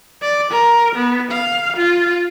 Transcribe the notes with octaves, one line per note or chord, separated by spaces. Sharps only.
D5
A#4
B3
F5
F4